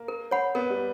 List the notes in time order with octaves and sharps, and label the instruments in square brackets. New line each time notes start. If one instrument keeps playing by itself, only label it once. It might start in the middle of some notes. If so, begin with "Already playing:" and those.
Already playing: [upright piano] A#3
[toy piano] A#4
C#5 F#5 B5
[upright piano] B3 [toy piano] A#4
[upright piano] G3